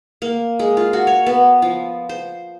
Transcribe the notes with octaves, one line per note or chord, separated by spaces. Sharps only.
A#3
G#3
F4
F#4
C#5
B3
F3
C5